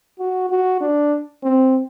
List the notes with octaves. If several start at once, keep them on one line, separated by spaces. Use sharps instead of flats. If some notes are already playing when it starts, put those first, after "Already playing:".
F#4
F#4
D4
C4